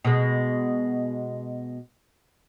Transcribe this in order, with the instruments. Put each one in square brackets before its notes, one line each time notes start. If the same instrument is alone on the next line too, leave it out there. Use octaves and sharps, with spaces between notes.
[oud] B2 G#3